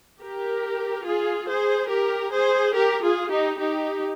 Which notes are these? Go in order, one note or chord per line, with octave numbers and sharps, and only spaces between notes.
G4 A#4
F4 G#4
G#4 C5
G4 A#4
G#4 C5
G4 A#4
F4 G#4
D#4 G4
D#4 G4